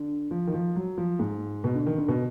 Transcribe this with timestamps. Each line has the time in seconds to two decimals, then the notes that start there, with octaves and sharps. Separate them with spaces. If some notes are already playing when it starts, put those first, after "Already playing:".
Already playing: D3
0.31 F3
0.47 D#3
0.54 F3
0.76 F#3
0.97 F3
1.19 G#2
1.64 B2
1.75 D3
1.86 D#3
1.98 D3
2.08 B2